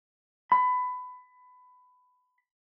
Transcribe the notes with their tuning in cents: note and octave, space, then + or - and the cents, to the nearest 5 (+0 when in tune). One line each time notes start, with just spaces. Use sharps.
B5 +20